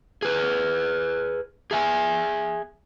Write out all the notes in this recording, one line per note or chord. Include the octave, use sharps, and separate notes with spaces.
G#4 B4
G#4 E5 G#5